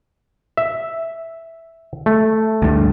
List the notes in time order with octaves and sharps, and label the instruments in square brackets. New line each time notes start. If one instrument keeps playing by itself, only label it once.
[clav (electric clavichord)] E5
A3
[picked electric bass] D2 G2